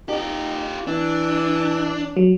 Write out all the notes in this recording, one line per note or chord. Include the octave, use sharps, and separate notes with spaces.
D#4 F4 G4
E3 D4
F#3